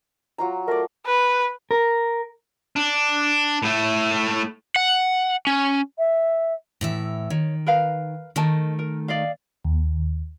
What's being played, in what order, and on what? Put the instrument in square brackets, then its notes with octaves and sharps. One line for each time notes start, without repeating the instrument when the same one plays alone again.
[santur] F#3 F4 A#5
[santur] A3 D5 [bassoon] A#4
[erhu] B4
[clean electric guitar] A#4
[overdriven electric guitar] D4
A2 A3
[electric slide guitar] F#5
C#4
[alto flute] E5
[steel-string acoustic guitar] A2 E3 E5
[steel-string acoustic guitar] D#3 [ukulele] C#5
[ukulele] A#4 B4 F5
[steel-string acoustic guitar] D#3 A3 [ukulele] A#4 D#5 A5
[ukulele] A#4
D5 D#5 F5
[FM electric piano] D#2